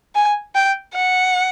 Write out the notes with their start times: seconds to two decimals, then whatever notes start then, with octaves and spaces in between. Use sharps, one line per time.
0.15 G#5
0.55 G5
0.94 F#5